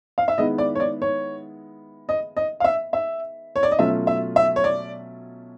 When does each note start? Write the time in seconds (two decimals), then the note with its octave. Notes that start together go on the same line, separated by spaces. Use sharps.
0.18 F5
0.28 E5
0.38 D#3 G#3 B3 E4 D#5
0.58 D5
0.75 C#5
0.80 D5
1.02 C#5
2.09 D#5
2.37 D#5
2.60 F5
2.64 E5
2.93 E5
3.56 C#5
3.63 D5
3.72 D#5
3.79 B2 F#3 A3 C#4 F4 E5
4.07 E5
4.36 E5
4.56 C#5
4.64 D5